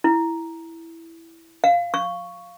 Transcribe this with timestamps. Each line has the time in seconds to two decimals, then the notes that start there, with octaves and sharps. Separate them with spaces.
0.04 E4
1.64 F5
1.94 C#6